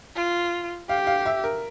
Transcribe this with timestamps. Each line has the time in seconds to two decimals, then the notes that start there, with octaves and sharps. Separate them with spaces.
0.16 F4
0.89 G4 F5
1.07 F5
1.26 E5
1.44 A#4